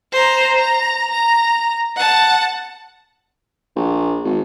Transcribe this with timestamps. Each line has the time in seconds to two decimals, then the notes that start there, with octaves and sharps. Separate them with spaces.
0.13 C5 A#5
0.57 A#5
1.11 A#5
1.96 F#5 A5
3.76 A#1
4.24 G#1